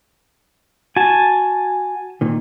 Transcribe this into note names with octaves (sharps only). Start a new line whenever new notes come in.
F#4 G#5 A5
A#2 D#3